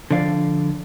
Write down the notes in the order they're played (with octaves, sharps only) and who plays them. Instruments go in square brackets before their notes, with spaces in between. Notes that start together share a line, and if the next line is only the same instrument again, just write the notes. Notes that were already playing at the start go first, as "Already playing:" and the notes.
[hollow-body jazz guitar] D3 F3 D5 F5